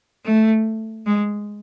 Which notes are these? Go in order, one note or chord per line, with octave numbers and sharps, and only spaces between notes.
A3
G#3